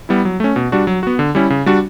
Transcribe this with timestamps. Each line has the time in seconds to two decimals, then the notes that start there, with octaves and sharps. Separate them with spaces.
0.09 G3 B3 E4
0.25 F#3
0.40 A3 C#4
0.56 B2
0.72 G3 D4 F#4
0.87 F#3
1.03 B3 F#4
1.19 D3
1.35 G3 C#4 E4
1.50 C#3
1.66 G3 D4 F#4